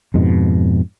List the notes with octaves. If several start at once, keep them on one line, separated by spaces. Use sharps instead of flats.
F2 G#2 B2